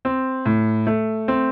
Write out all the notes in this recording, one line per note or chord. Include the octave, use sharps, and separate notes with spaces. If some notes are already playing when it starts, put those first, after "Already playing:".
C4
A2
A3
C4